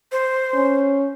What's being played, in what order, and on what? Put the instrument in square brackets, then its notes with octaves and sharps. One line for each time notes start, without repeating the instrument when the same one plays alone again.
[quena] C5
[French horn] C#4